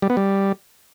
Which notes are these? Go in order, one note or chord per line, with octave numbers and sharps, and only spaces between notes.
G3
B3
G3